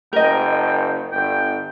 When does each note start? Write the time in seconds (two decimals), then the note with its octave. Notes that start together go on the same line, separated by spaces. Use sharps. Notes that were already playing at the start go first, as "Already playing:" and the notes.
0.13 F#1 A#4 D#5 G5
1.12 G1 G5